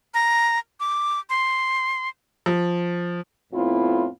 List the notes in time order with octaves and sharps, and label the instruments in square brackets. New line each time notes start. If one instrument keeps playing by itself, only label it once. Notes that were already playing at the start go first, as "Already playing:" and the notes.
[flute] A#5
D6
C6
[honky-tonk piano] F3
[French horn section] F2 A2 B3 C4 E4 F4